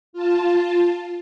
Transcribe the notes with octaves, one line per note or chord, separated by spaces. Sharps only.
F4 A5